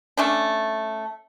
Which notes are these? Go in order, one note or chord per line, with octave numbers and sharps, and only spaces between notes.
A3 C#4 D4